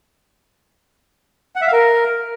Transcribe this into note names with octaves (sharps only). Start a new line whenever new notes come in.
F#5
E5
F5
A#4